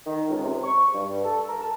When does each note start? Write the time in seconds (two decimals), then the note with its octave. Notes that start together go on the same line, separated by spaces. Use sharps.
0.06 D#3
0.29 C#2
0.43 C3
0.63 C#6
0.94 G2
1.25 A4
1.48 A#4
1.62 A5